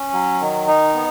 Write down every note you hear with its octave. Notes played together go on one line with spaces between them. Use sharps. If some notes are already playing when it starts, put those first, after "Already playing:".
Already playing: C#4
F#3
D#3
D#4
B3